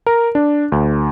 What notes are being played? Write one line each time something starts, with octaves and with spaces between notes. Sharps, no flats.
A#4
D4
D2